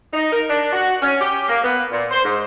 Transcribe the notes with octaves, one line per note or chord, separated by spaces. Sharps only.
D#4
A#4
D4
F#4
C#4
G4
A#3
B3
A#2
C5
G#2